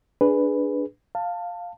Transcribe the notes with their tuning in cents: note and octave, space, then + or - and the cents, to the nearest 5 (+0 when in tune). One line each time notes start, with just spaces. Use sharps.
D4 +0 G#4 +0 B4 +0
F5 +5 A5 +15